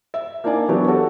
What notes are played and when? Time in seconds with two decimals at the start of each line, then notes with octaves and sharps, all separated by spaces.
0.14 E5
0.44 A#3 D4 D#4 D5 G#5
0.68 E3 F#3 B3 C#4 G4 D5
0.87 F#4 A4 C#5